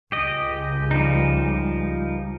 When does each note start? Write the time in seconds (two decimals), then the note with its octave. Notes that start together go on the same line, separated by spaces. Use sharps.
0.12 C#2 G4 D#5
0.91 F3 G3 D#4